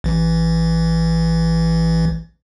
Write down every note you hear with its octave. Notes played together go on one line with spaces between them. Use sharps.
A1 E3